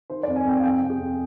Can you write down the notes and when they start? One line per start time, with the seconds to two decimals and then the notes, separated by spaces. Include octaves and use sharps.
0.10 D#3 C5
0.23 F2 D5
0.36 G#5
0.45 F2 G5
0.59 F5
0.63 F2 G5
0.81 C3
0.90 G#4
0.99 F2